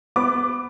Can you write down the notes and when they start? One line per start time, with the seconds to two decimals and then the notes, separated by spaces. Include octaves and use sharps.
0.16 B3 D6